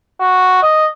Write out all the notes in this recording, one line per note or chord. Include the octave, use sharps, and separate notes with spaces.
F#4
D#5